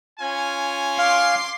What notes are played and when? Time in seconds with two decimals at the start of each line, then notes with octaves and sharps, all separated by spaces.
0.19 C#4 F4 G#5
0.98 F5 C6 D6 C7